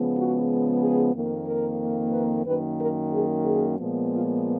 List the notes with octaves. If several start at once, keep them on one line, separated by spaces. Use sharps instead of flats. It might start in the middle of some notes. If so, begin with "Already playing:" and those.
Already playing: C#3 F3 G#3 B3
F#4
G#4
F2 D#3 A#3
A#4
B4
F#2 D#3 A#3 B4
A#4
G#4
G#4
A#2 F3 G#3 B3
F4